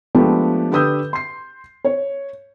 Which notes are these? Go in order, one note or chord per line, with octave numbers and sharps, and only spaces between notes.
F3 G#3 A3 B3 D4 G4
D3 G4 B4 D#6 E6 G6
C6 C7
C#5